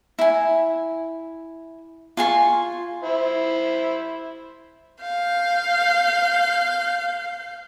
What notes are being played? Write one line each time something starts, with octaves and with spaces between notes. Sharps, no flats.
E4 G#5
F4 G#5 C6 C#6
E4 C5
F5 G6